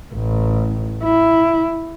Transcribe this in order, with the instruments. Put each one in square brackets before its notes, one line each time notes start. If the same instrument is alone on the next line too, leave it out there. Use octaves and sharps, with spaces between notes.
[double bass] A1
E4